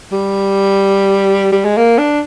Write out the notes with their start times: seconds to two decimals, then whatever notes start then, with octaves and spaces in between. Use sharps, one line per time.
0.12 G3
1.52 G3
1.65 G#3
1.78 A#3
1.98 D4